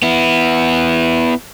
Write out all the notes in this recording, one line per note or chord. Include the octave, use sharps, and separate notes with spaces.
B3 E4